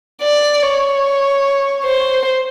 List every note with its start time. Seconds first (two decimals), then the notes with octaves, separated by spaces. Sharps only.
0.22 D5
0.62 C#5
1.85 C5